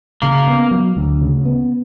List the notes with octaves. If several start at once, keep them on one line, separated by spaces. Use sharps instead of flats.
C#3 A#3
B3
F#3
D2
C#3
B3